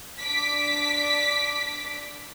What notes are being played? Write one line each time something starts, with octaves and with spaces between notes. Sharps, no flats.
D4 D6 B6